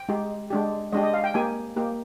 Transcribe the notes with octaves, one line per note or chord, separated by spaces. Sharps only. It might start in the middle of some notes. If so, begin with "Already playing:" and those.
Already playing: G5
G#3 D#4 G4
G#3 D4 G4
G#3 D4 G4 D#5
D#5
F5
G5
A#3 D#4 G4 G#5
A#3 D#4 G4